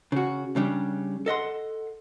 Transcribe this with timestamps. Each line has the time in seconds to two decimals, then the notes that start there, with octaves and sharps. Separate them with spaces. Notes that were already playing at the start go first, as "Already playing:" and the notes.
0.12 C#3 F#4
0.56 C#3 G3 D4
1.26 A4 D#5 F#5 C6